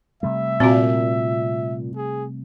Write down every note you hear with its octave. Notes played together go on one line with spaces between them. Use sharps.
C3 G3 A3 E5
A#2 C4 F#4
G#4